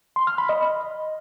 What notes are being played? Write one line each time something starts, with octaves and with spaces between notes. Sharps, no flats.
C6
F6
B5
D#5